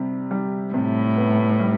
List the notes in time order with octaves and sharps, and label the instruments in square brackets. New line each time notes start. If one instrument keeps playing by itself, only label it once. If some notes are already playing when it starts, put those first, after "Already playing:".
Already playing: [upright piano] C3 G3
G3
[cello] A2 [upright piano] C3
[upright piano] B3
G3